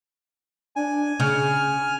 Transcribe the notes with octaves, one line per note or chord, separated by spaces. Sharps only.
D4 G#5
C#3 F6